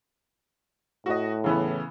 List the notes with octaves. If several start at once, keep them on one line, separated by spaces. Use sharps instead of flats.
A2 F#4 D#5
C#3 E3 B3